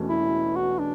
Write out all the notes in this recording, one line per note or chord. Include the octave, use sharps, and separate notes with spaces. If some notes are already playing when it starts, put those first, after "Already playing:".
Already playing: E1 E2 B2 A3 C#4
E4
F#4
D4